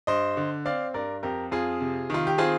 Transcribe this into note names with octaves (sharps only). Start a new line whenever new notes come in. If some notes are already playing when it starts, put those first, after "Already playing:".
G2 C5 D#5
D3
C4 D5 F5
G2 A#4 D5
F2 G4 A#4
F2 F4 G#4
C3
D#3 F4
G4
C4 F4 G#4